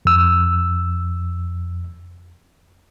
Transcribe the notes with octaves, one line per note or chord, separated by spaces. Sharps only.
F2 E6